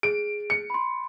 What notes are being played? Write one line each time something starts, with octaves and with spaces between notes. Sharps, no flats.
G#4 D7
C#7
B5 C6